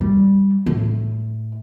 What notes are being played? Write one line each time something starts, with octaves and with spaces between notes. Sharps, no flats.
G3
A2